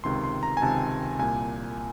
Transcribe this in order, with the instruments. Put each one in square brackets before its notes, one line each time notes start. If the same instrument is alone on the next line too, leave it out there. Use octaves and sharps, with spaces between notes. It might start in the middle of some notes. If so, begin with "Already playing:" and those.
[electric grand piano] C#2 C3 D#3 C6
C6
A#5
G#5
C#2 C3 D#3 A5
C2 A#2 G#5